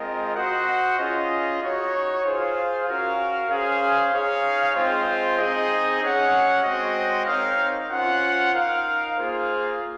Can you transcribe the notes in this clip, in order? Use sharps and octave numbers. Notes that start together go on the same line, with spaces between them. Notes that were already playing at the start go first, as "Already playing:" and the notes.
Already playing: G#3 C4 F4 A#4 D#5
F#4 C5 D#5 F#5
C#4 F4 G#4 D#5
D#4 F#4 C#5
F4 G#4 C5 F5
C#4 F#4 A#4 F5
C#4 G#4 C5 F5
D#4 G#4 C#5 F5
G#3 C4 F4 C5
C4 D#4 G#4 D#5
C#4 G#4 C#5 F#5
G#3 C4 F#4 C5 D#5
C4 D#4 A#4 C#5 F5
C#4 F4 C5 F#5
D#4 A#4 F5
A#3 F4 G#4 C5 F5